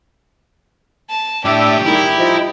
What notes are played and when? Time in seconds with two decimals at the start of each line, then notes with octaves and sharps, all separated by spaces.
1.10 A5
1.45 A2 D4 G4 D5 E5
1.86 D#3 G3 E4 G#4
2.19 F3 D#4